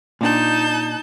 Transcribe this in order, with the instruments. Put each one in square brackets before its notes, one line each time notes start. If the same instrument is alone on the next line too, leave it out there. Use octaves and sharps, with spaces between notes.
[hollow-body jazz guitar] A#2 D4 [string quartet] D#4 A5 G6